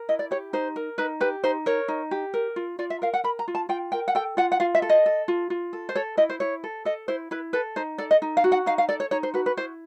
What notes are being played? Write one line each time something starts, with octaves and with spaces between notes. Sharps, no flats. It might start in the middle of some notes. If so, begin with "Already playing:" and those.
Already playing: A#4
E4 D#5
D5
G4 C#5
D#4 C5
A#4
D#4 B4
G4 B4
D#4 C5
A#4 C#5
D#4
G4
A#4
F4
F4 D5
E5
A#4 F5
F#5
A#4 B5
A#5
F4
A5
F4 G5
A#4 G5
F#5
A4 G5
F4 F#5
F#5
F4 F5
E5
A4
D#5
A4
F4
F4
A4
C5
A4 C#5
E4 D#5
C5
E4 C#5
A4
A4 D#5
E4 C5
E4 B4
A4 B4
D#4 C5
A4 D5
D#5
D#4
F5
F#4
F#5
D#4 F5
F5
A4 D5
C#5
D#4 C#5
C5
F#4 B4
B4
E4 C5